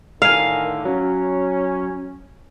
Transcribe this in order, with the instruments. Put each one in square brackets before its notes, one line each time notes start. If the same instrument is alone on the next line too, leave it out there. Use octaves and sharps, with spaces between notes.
[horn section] A2 D3 D#3 [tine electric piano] A#4 G#5 [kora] F5
[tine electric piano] F#3 [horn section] C#4